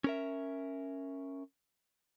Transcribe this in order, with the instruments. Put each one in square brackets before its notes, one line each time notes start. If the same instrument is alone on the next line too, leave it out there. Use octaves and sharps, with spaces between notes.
[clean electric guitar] C#4 A#4 E5